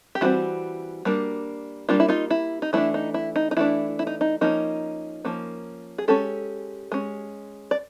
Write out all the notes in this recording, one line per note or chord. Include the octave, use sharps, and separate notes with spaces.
G4
E3 G3 C4 E4 F#4
G3 A#3 D4
G3 A#3 D4 F4
E4
D#4 F4
E4
D#4
E3 A3 D4 E4
D#4
E4
D#4
D#4
E3 A3 D4 E4
E4
D#4
D#4
F3 A#3 C#4 D#4
F3 A#3 C#4
G#4
G#3 C#4 G4 A4
G#3 C#4
D5